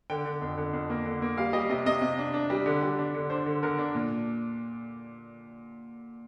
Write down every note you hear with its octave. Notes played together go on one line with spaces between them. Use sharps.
D3 G5
D3
F2
D3
F2
A#3
D3
A#3
G3 F5
G3 D#5
C3 D#5
C3 D#5
C3
D4
D4
G3
D3
G3
D4
D3
D4 C5
D3
D3 A#4
D4
A#2